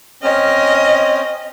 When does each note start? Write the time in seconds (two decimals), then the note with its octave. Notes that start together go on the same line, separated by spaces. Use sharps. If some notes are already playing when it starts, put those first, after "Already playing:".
0.23 C4 C#4 D#5 F6